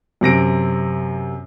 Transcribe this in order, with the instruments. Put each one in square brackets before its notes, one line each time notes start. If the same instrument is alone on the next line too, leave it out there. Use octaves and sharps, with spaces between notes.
[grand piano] F#2 C3 A#6 D7